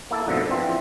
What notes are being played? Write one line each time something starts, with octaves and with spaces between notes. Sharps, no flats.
A#3 E4 A4
F2 G#2 B2 D3 F3 A3
E3 F3 C4